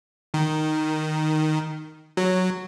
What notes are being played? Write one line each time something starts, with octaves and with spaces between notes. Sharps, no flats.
D#3
F#3